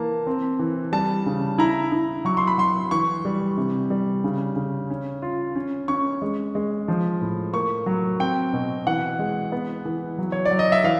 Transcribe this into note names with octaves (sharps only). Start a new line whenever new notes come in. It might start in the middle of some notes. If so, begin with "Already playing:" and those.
Already playing: E3 A#3 A5
C4
E3
G3 A5
C#3
E4 A#5
E4
F#3 C#6
C6
B5
F#3 C6
E3 C#6
G3
C3
G3
C#3
C#3
C#4
F4
C#4
C#4 C#6
G#3
G#3
F3
A2
A#3 C#6
F#3
C4 G5
B2
E3 F#5
G#3
B3
E3
F#3
C#5
D5
F#3
D#5
E5
E3 F5